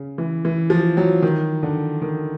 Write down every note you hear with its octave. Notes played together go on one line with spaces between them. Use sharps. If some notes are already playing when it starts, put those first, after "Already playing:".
Already playing: C#3
E3
E3
F3
F#3
D#3
D3
D#3